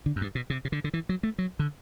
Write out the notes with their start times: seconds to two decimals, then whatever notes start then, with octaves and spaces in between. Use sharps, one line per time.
0.06 D3
0.16 F#2
0.21 G2
0.35 B2
0.50 C3
0.65 C3
0.72 D3
0.84 D3
0.93 E3
1.09 F#3
1.23 A3
1.38 F#3
1.59 D3